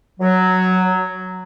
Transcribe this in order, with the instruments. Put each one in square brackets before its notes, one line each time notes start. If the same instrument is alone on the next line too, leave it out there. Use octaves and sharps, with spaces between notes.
[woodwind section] F#3